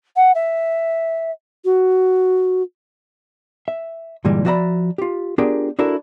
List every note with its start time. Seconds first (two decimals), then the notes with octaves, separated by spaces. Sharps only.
0.16 F#5
0.35 E5
1.65 F#4
3.68 E5
4.25 G2 A#2 D3 E3 G3 G#3
4.45 F3 F#4 D5 E5 A#5 B5
4.98 F4 G4
5.38 B3 D4 F4 G4 G#4 A#4
5.79 D4 E4 F#4 A4 A#4 E5